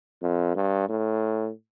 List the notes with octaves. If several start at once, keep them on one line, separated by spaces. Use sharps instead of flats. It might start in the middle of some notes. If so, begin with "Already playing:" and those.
F2
G2
A2